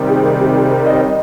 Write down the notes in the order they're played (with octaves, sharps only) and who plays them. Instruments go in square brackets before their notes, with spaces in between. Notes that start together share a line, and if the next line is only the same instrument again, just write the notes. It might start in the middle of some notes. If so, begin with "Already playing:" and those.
Already playing: [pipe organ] C3 D#3 G3
[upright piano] G#4
A#4
G4
G#4
A#4
D#5
C#5
D#5